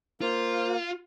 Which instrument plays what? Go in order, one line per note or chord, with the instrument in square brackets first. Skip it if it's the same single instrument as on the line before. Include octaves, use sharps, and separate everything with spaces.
[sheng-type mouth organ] A#3 [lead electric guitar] F4 [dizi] C5